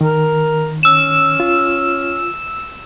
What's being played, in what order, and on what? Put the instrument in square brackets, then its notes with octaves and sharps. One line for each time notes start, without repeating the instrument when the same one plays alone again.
[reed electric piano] D#3 [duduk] A#4
[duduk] C#4 [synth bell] E6 E7
[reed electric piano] F4